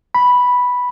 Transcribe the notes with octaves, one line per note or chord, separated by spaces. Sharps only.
B5